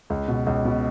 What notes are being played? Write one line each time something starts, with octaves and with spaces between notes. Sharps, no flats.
C#2
B2
C#2
B2